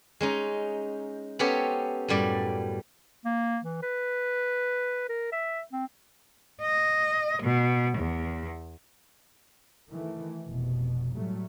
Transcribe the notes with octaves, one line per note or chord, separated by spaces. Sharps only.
G#3 C#4 D#4
B3 C#4 G4 A4 C5 C#5
F#2 A2 G3 D5
A#3
E3
B4
A#4
E5
C4
D#5
B2
E2
D#3 E3 A3
F1 B2
A2 F#3 G3 A3